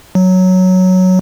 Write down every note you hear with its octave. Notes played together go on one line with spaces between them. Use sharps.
F#3